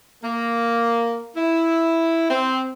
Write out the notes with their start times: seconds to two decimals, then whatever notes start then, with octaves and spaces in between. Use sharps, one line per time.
0.24 A#3
1.36 E4
2.30 C4